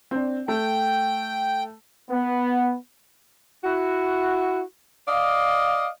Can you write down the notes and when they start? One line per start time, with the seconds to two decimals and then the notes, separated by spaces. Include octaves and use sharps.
0.11 C4 D4
0.48 A3 G5
2.10 B3
3.64 E4 F#4
5.08 D5 D#5 F5